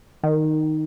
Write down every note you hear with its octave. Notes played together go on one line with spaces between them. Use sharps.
D#3